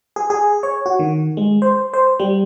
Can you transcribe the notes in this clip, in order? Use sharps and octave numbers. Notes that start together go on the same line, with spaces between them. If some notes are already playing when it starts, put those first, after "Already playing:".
G#4
G#4
C#5
F#4
D#3
G#3
C5
C5
G3